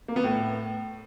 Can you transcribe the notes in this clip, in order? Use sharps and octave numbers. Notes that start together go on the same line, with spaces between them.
A#3
B3
A2